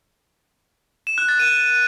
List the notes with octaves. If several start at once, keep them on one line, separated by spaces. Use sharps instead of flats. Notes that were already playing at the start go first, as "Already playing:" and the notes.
E7
F#6
A6
D#7